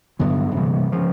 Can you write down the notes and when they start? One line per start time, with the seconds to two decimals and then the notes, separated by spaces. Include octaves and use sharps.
0.19 G2 D3 F#3 B3
0.56 C3 E3 G3 A#3
0.92 C#3 F3